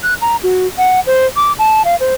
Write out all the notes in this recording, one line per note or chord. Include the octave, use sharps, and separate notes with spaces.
F#6
A#5
F#4
F#5
C5
D6
A5
F5
C5